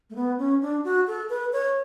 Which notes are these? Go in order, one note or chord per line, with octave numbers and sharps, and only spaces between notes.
A3
B3
C#4
D4
F#4
A4
B4
C#5